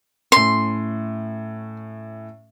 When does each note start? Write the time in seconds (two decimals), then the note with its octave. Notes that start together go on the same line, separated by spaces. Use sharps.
0.32 A2 C#4 C6